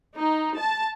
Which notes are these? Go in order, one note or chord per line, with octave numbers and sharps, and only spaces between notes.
D#4
A5